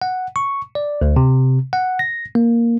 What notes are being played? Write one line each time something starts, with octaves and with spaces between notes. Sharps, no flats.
F#5
C#6
D5
D2
C3
F#5
A#6
A#3